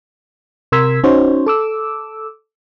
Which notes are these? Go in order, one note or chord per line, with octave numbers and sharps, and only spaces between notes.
C3 A#4 C6 E6 G#6 B6
C#4 D#4 F#4 C5 C#5
A4 D6 E6